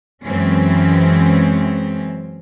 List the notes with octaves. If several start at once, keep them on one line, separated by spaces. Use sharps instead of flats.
F#2 E3 F#3 G#3 C4 C#4